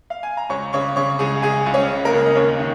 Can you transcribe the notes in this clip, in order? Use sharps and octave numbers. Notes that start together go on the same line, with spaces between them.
F5
G#5
A#5
C#2 C#5 C#6
C#3 C#5 C#6
C#3 C#5 C#6
C#2 G#4 G#5
C#2 G#4 G#5
C#2
C#4 C#5
C#3
A#3 A#4
C#2
D#5
D#2 C#4 C#5
D#3